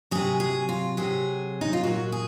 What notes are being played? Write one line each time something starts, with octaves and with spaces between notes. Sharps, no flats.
C3 F#3 G#4
G#4
F4
C3 F#3 G#4
D#4
F4
A#2 F#3 F#4
G#4